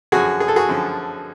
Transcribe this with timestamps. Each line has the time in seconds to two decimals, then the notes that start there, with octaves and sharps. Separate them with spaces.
0.12 F#2 D3 F3 F#4 G#4
0.40 G#4
0.48 A4
0.56 F#4 G#4
0.69 F#2 D3 F3